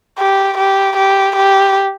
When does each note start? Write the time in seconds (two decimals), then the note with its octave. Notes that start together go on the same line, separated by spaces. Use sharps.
0.18 G4
0.57 G4
0.97 G4
1.36 G4